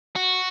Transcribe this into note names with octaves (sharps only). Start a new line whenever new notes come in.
F#4